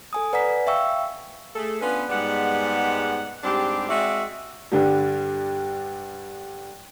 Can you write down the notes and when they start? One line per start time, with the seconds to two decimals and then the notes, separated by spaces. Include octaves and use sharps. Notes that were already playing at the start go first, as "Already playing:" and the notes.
0.13 A4 G#5 D#6
0.33 B4 D5 F#5 G#5 A#5 B6
0.67 E5 F5 G5 C#6 E6
1.55 A3 G#4 A4
1.81 B3 C#4 D4 F4 B4
2.10 G#2 G3 G#3 B3 D5 F#5
3.44 G#2 G3 C4 D4 G4
3.89 G#3 C4 F#4 D5 E5
4.72 G2 D3 G3